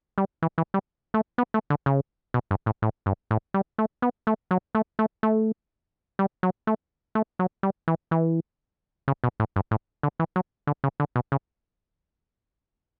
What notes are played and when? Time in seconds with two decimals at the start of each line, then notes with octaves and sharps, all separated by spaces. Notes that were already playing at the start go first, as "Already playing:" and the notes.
0.18 G3
0.42 E3
0.58 E3
0.74 G3
1.14 A3
1.38 B3
1.54 A3
1.70 D3
1.86 C#3
2.34 B2
2.51 G2
2.66 A2
2.82 A2
3.06 G2
3.31 A2
3.54 G3
3.79 A3
4.02 B3
4.27 A3
4.51 F#3
4.75 A3
4.99 A3
5.23 A3
6.19 G3
6.43 F#3
6.67 A3
7.15 A3
7.39 F#3
7.63 G3
7.88 E3
8.11 E3
9.08 C#3
9.24 B2
9.40 A2
9.56 G2
9.71 A2
10.03 D3
10.20 E3
10.36 F#3
10.67 D3
10.84 C#3
11.00 D3
11.16 B2
11.32 C#3